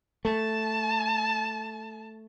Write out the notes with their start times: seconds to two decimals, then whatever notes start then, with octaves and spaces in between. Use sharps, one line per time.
0.25 A3 A5